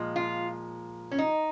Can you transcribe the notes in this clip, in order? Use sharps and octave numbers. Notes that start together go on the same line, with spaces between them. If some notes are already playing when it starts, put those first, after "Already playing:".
Already playing: A#2 F3 G#3
F4
C#4
D#4